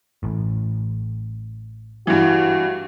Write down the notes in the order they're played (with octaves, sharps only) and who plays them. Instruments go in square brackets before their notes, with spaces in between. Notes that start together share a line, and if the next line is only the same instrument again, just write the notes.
[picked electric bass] A1 A2
[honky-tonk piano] G2 E3 [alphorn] F#4